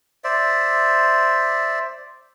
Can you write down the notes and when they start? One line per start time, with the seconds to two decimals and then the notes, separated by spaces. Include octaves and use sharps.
0.24 C5 D5 E5